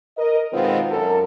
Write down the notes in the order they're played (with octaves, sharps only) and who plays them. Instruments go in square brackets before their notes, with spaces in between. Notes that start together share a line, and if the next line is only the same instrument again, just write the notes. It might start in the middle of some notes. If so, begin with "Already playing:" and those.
[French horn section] A#4 D#5
B2 D#3 G#3 B3 C4 F4
F#2 A4 A#4